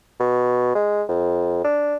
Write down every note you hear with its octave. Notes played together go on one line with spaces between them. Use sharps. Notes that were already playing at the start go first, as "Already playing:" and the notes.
B2
G#3
F2
D4